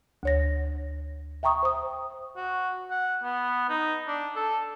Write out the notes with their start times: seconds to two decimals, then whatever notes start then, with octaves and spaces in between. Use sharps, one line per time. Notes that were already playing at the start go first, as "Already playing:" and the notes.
0.23 D2 C#5 A#6
1.43 E5 G5 A#5 C#6 D#6
1.63 C5 D#6
2.36 F#4
2.90 F#5
3.23 B3
3.69 D#4
4.07 D4
4.35 A4